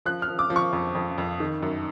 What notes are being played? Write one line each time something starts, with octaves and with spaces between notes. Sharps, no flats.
F3 F#6
F6
F3
D6
F3
C#6
F2
F2
F2
D#3
F#2